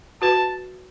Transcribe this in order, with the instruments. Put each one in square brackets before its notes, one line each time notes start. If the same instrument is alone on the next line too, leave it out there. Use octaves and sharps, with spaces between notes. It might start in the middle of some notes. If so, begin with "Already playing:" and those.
[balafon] F#4 B4 [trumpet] A5